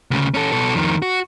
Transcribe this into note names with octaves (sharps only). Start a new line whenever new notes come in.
D2 C#3
C#4 A4
B2 A4
F2 D#3
F#4